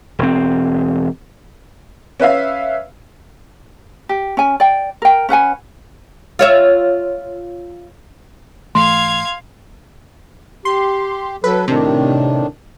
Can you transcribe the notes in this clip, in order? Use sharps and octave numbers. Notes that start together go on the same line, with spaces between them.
E1 C4
C#4 B4 E5 F5
G4
C#4 G#5
D5 G5
A#4 G5
C#4 B4 F#5 G#5
F4 C#5 E5
G#2 E3 A3 F5 C6 G#6
G4 C6
F#3 A4 B4
A2 C3 D#3 D4